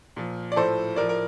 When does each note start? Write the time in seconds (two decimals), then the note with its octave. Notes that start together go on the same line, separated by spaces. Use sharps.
0.16 A#2 F3
0.52 D5
0.56 A2 F3 A4 C5
0.96 A2 F3 A#4 D5
1.09 A#4